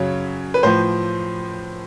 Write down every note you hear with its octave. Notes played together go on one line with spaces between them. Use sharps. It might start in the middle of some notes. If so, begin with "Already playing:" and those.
Already playing: F#2 C#3 F#3 C#5
B4
A2 F3 C5